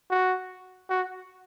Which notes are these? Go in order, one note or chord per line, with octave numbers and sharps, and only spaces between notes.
F#4
F#4